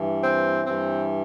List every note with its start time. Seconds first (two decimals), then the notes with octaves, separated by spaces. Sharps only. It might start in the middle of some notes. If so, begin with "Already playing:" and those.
Already playing: G2 E3
0.23 C4
0.66 G2 E3 C4